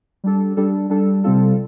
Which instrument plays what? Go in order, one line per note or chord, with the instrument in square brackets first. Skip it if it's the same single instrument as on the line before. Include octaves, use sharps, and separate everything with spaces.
[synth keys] G3 D4 A4
G3 D4 A4
G3 D4 A4
C3 G3 C4 F4 A4